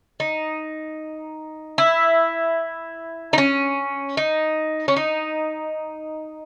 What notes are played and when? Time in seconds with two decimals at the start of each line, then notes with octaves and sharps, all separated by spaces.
0.20 D#4
1.78 E4
3.33 D#4
3.38 C#4
4.17 D#4
4.88 C#4
4.96 D#4